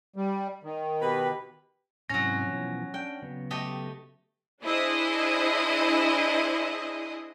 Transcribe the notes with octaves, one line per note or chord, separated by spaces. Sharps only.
G3
D#3
B2 G4 B4
G#2 C3 F#3 C#4 E4 A#6
B2 E3 F3
C#4 D4 G5
C#3 F#3 B3
A3 G4 D#5
D4 E4 G#4 C5 D#5